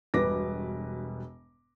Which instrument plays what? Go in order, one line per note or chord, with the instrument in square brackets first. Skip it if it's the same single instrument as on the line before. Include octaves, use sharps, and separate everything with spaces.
[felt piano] E1 G2 B2 B4 D6 A#6